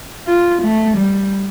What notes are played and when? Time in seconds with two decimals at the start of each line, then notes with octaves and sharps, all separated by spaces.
0.28 F4
0.63 A3
0.97 G3